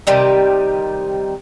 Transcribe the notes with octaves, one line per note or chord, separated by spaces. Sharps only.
C3 D#3 G3 D#4